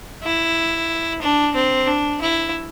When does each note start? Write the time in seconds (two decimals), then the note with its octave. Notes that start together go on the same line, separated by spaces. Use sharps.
0.24 E4
1.21 D4
1.55 C4
1.87 D4
2.21 E4